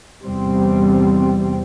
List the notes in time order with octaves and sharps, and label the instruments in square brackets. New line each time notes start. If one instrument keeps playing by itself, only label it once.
[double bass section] E2 C3 G3 C4